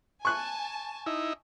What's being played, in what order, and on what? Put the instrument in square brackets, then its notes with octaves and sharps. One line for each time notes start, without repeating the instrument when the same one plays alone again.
[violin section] G#5 A5 [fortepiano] C#6 F#6
[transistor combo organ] D#4 E4